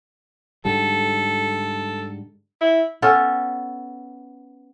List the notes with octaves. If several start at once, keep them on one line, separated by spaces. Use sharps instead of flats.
G#2 D3 G3 A4
E4
B3 C#4 A4